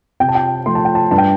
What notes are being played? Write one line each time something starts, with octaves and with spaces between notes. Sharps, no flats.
C3 G5
A5
G5
F3 A3 C6
A5
G5
A5
G2 A5
G5